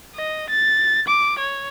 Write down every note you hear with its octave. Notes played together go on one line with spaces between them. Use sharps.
D#5
A6
D6
C#5